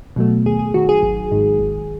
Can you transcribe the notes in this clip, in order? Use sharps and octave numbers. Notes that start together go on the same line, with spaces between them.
B2 F#3 A3
D#2 G#4
G#4
D#3 F#3 F#4
G#4
G#1
G#2 D#3
G#1